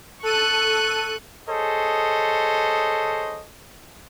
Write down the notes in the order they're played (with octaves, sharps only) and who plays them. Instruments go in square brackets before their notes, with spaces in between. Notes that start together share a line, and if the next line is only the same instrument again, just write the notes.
[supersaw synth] A4 D#7 [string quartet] C#6 F#6
[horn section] G#4 A4 C5 C#5 D#5